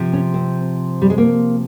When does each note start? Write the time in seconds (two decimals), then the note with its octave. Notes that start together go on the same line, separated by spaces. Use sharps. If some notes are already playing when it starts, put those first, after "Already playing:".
Already playing: C3 F3
0.13 C#4
0.34 C4
1.02 G3
1.10 G#3
1.18 A#3